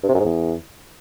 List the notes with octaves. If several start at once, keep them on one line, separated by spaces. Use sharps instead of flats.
G2
C3
F#2
G#2
E2